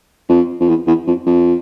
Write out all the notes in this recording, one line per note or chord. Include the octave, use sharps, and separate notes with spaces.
F2
F2
E2
E2
F2
F2